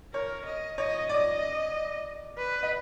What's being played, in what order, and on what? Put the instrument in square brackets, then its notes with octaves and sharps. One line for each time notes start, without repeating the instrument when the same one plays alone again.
[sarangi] A#4 [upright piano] C#5
[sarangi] D#5
[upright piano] C#5 [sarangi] D#5
[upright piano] D5 [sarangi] D#5
[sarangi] B4
[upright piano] D#5